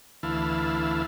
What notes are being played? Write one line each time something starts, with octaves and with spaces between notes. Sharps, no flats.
D2 E3 E4 F5 A5